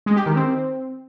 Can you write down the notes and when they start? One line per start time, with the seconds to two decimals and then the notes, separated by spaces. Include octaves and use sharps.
0.06 G#3
0.16 G4
0.26 D#3
0.36 C4